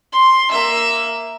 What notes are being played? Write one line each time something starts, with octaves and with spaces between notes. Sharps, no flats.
C6
A#3 E5